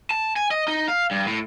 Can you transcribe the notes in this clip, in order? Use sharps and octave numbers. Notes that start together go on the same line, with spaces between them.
A5
G#5
D#5
D#4
F5
G2
A2